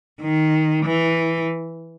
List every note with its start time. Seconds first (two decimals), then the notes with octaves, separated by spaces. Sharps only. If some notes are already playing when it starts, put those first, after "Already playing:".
0.22 D#3
0.85 E3